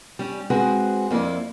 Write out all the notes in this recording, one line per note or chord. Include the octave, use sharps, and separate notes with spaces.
G3 C#4
G#3 C4 F#4 G#4 B4 C5
F2 A#3 E4 D5